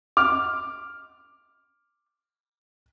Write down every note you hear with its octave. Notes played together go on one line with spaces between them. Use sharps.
D6 F6